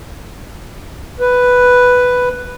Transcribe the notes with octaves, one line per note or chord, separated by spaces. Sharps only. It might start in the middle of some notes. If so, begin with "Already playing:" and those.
B4